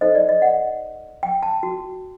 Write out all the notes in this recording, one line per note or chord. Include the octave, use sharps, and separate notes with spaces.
D#4 A4 C5 D#5
D5
D#5
F#5
G5
A5
F#4